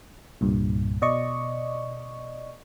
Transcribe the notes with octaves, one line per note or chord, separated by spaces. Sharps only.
C2 G2 A#2
B2 D5 D#5 C#6